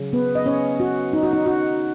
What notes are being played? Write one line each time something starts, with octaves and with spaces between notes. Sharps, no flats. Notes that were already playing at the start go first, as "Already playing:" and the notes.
Already playing: C#3 F#3
B3 B4
D#5
C#4 C#5
F#4
D#4
F#4
D#4
F#4